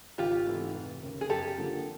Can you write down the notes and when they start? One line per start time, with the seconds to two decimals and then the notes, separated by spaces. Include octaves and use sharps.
0.18 G#1 F4 G4
0.47 G#2 E3 A3 C4
0.74 F1
1.02 D#2 C#3
1.21 G#4
1.30 F#2 G4 A4
1.58 D3 F3 A#3